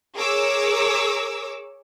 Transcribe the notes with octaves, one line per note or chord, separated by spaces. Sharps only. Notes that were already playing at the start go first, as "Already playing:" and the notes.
G#4 A#4 C#5 D6 E6